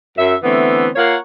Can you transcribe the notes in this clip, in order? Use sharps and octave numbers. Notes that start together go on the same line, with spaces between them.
F#2 E5
D3 E3 A3 B3 C4
A#3 F4 A#4 C#5 F#5